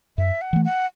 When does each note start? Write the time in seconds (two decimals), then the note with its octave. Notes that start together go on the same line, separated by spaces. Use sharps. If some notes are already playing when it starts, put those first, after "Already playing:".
0.18 F#2 E5
0.41 F#5
0.53 E3 A3
0.65 F#5